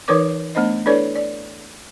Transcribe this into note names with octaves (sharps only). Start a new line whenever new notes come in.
E3 D#4 A#4 B4 C#5 D6
A3 B3 D4 C5 D#5
D4 E4 A4 B4 C#5 D5
D5